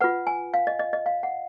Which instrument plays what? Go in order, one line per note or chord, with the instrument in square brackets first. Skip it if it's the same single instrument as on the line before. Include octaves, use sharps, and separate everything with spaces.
[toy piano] F4 B4 F#5
G#5
F5
D#5
D#5
D#5
F5
F#5